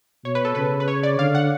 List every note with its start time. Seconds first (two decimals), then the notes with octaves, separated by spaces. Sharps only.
0.25 B2 C#5
0.35 B4
0.45 A4
0.55 C#3 B4
0.80 B4
0.88 C#5
1.03 D5
1.19 D3 F5
1.35 F#5